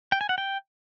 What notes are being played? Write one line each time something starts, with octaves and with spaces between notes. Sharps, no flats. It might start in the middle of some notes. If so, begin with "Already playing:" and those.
G5
G#5
F#5
G5